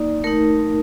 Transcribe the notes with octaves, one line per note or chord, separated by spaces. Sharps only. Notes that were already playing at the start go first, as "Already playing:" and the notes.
Already playing: A#3 D#4 D5
A3 D#4 A#4